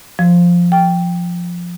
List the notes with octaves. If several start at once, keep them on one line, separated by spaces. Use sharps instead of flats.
F3
G5